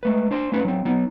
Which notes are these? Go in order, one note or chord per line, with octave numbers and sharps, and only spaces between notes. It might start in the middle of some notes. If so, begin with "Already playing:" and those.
G#3 A3 B4
D4 C5 C6
A3 C#4 D#4 B4
F#3 C4
F#3 B3 D#4